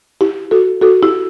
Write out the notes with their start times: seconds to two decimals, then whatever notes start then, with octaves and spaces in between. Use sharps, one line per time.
0.21 E4 G4
0.51 F#4 A4
0.82 F#4 A4
1.03 E4 G4